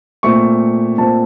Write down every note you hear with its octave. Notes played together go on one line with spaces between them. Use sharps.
A#2 A3 C4 C#6
A#2 A3 C4 A5